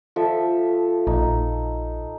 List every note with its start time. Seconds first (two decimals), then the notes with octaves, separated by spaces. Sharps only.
0.16 F3 A4 E5
1.07 A#1 D#4